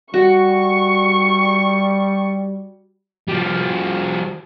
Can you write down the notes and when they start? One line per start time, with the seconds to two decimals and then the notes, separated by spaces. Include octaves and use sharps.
0.14 G3 F#4 C#6
3.29 F3 G3